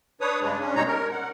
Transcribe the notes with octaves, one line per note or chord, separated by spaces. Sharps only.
D4 B4 C#5 D#6
G2 C#3 G#3 D4
C#4 D4
B2 G3 G#3 D#4 C#5 A#5
A#4
F#5